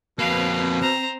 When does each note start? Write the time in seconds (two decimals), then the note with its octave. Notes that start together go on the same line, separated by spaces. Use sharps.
0.19 F2 B2 A#3 C4 B4 F5
0.81 C5 A#5